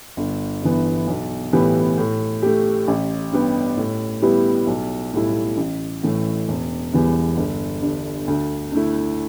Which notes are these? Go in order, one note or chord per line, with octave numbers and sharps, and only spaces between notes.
G1
G2 E3 B3
B1
A2 E3 B3 G4
A2
A3 G4
A1
G2 G3 B3 G4
A2
G3 B3 E4 G4
B1
A2 G3 E4
A1
A2 E3 A3
E1
E2 E3 G3 B3
G1
G2 D3
D2
D3 A3 E4